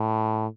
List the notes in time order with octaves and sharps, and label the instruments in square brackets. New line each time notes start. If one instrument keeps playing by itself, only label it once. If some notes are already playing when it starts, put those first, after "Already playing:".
Already playing: [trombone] A2